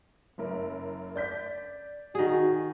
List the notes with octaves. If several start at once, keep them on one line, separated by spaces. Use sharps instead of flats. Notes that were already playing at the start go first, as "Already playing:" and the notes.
F#1 F#2 A#4
D5 G6 B6
D#3 F#4 G#4